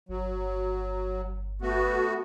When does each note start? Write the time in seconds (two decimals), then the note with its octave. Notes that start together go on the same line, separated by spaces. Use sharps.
0.09 G1 F#3
1.62 A3 B3 F#4